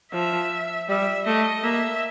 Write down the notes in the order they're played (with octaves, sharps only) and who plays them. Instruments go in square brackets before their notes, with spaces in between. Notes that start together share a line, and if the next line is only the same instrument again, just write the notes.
[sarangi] F3 [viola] E5
[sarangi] G3 [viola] E5
[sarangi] A3 [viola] D#5
[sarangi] A#3 [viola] E5